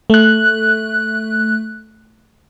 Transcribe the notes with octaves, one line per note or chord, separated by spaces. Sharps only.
A3 F#6